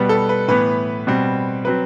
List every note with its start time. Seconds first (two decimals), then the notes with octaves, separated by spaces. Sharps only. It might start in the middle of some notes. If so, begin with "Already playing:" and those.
Already playing: B2 G3 B3 B4
0.09 A4
0.29 B4
0.48 A2 E3 B3 B4
1.07 B2 G3 C4
1.65 F#3 C4 B4